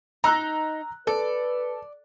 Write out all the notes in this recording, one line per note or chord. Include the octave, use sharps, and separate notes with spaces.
D#4 A#5 E6 F#6
A4 B4 D5